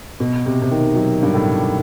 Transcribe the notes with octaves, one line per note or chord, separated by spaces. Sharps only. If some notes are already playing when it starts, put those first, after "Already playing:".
B2
C3
C3
D#3
F#3
G2
A2